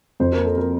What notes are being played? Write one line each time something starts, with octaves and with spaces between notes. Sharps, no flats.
F2 C5
A#4
A#3
A4
A#4